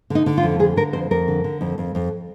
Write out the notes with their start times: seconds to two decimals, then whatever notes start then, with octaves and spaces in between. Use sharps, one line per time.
0.10 D3 D#4
0.26 D3
0.37 F4
0.43 F2
0.59 D3 G#4
0.76 D3 A#4
0.93 F2 C5
1.11 F2 A#4
1.28 D3
1.44 D3
1.61 F2
1.78 F2
1.95 F2